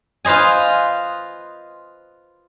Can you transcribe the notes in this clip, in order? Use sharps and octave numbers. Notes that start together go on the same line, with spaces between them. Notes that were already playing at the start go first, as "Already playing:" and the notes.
F4 B4 C5 D#5 G#5